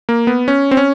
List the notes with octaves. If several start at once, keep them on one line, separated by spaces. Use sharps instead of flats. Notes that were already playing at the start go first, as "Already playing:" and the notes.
A#3
B3
C#4
C4
C#4